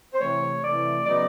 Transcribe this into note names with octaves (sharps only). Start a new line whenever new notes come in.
C5
C3 E3 A3 C#5
C3 E3 A3 D5
C#3 F#3 B3 D#4 D5